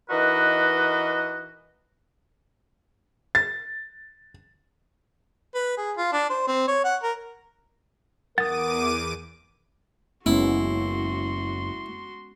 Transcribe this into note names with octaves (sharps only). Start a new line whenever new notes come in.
E3 D#4 F#4 A#4 B4 D#5
A6
B4
G#4
F4
D4
C5
C4
C#5
F#5
A#4
E2 A#4 F#5 D6 D#6 A6 D#7
F#1 G#3 B3 C#4 E4 F#4 C6